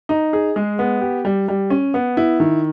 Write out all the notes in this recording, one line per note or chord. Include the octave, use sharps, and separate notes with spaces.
D#4
G#4
G#3
B3
G4
G3
G3
C#4
B3
E4
D#3